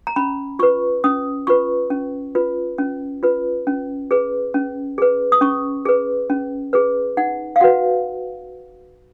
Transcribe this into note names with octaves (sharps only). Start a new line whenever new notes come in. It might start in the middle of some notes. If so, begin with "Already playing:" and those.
A#5
C#4 B5
F4 B4 C#6
C#4 D#6
F4 B4 C#6
C#4
F4 B4
C#4
F4 B4
C#4
G#4 B4
C#4
G#4 B4
D#6
C#4 C#6
G#4 B4
C#4
G#4 B4
D#4 F#5
F5
F#4 B4 F#5